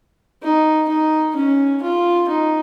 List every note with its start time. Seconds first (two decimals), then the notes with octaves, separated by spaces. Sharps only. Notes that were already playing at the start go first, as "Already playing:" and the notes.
0.43 D#4
0.88 D#4
1.35 C#4
1.82 F4
2.28 D#4